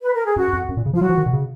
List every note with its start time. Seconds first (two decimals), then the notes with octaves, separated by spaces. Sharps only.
0.02 B4
0.14 A#4
0.25 G#4
0.36 F#2 F#4
0.53 F2
0.69 F#2
0.77 A#2
0.86 C#3
0.93 F3 F4
1.01 F#3 F#4
1.09 F3
1.17 D#3
1.26 B2
1.33 C#3